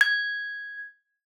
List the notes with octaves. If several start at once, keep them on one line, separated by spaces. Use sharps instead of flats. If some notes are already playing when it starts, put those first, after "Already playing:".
G#6